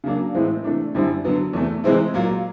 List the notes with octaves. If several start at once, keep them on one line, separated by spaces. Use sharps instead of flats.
C#3 F#3 A#3 D4
A2 E3 G#3 C4
C3 E3 A3 D4
F#2 D3 G3 C4 E4
D3 F#3 B3
E2 C3 E3 A3
C3 E3 G#3 C4 E4
A#2 F#3 A#3